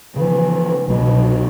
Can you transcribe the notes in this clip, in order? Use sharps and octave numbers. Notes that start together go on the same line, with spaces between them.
C#3 E3 F3
C2 B2 F#3